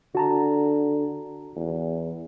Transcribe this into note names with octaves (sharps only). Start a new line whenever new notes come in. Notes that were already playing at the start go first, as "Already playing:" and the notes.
D3 F#4 A5 A#5
E2